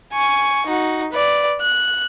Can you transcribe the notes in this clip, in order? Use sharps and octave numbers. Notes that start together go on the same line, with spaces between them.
G#5 C#6
D#4 F#4
B4 D5
F#6